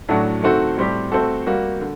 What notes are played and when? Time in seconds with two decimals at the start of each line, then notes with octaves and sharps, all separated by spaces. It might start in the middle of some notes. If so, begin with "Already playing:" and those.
0.09 A2 F#3 A3 D4 F#4
0.42 D#3 A3 C4 F#4 A4
0.77 A2 G3 C4 G4
1.12 A3 C4 F#4 A4
1.46 G3 A#3 F#4
1.80 D3